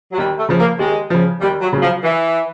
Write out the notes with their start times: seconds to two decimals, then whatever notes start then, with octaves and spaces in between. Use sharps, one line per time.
0.12 F#3
0.18 D#2 G3
0.38 A3
0.49 C#3 F3
0.59 A#3
0.79 D#2 G#3
1.10 C#3 F3
1.41 D#2 G3
1.61 F#3
1.73 C#3 F#3
1.82 F3
2.03 E3